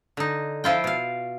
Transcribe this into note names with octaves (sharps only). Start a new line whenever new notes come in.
D3 D#4
F3 E4 F4 G5
B2 F5